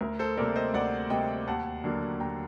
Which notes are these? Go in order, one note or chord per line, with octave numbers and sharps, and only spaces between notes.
D2 A#4
A4 C5
C3 G3 A#3 A#4 D5
C5 D#5
D2 D5 F#5
C3 G3 A#3 D#5 G5
D#2 F#5 A5
D3 F#3 A#3
D#2 G5 A#5